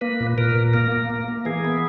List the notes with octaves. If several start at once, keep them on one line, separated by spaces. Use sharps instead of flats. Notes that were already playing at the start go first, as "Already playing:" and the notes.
A#3 B4
A#2
A#2 A#4
A#2
A#3 A#4
A#3
A#3
A#3
E3 G#4
B3